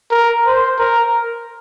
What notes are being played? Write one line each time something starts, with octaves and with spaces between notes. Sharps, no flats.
A#4
C5
A#4